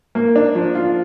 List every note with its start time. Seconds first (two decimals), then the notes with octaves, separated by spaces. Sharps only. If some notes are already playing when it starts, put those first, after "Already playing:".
0.15 A#3
0.36 D4
0.55 F3
0.75 F4